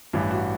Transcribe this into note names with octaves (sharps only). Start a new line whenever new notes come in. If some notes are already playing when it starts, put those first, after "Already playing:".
A1 G2 E3
F#4